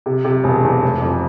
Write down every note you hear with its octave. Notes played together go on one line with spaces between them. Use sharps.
C3
C3
E1
E2
F1
F2